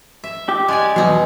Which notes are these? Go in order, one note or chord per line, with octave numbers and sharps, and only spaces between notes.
E5
G4
G#3 D5 G#5
E2 G2 B2 F#3 D#4